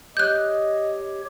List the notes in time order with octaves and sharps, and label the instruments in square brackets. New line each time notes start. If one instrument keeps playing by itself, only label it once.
[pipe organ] G4 C#5 [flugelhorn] D#5 [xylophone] F#6 G6